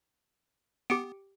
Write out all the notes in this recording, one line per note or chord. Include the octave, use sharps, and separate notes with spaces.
B3 G4 C#7 D7